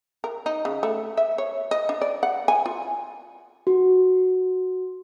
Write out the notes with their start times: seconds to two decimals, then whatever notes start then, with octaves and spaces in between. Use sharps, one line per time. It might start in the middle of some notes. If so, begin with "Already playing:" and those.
0.24 A#4
0.46 D#4
0.65 C#3
0.83 A3
1.17 E5
1.38 C#5
1.71 D#5
1.89 D4
2.02 D5
2.23 F#5
2.48 G#5
2.66 F4
3.67 F#4